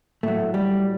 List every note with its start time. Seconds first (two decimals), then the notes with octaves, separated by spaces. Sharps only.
0.23 A2 F#3 A3
0.54 G3